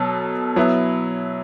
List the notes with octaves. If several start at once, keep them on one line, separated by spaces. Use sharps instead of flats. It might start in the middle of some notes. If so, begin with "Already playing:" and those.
Already playing: B2 F#3 A4
F#3 B3 E4